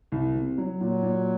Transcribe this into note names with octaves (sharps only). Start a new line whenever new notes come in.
C2
C3
F#3
A#2 F#3
A#2